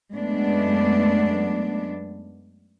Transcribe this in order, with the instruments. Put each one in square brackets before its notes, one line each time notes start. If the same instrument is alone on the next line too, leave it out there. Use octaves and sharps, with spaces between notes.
[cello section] F#2 G#3 A3 B3 D4